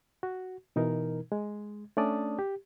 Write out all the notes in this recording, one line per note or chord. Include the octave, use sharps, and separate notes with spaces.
F#4
B2 E3 D#4 A#4
G#3
A3 C#4 D4 D5 A5 D#6
G4